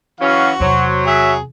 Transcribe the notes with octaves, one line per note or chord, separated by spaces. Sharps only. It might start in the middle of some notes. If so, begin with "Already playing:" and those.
E3 F#3 C#4 F#4 F5
E2 C3 F#3 C5
G#4 E5